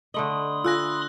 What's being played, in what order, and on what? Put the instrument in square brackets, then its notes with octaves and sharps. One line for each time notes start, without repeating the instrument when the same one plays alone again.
[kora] D3 A3 D#5 [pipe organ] B5 C6 D#6
[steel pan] F4 A4 G#5 [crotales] E6 F#6 A#6